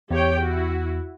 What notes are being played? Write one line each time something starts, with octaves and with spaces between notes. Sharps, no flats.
E2 G4 C#5 G5
E4 F#4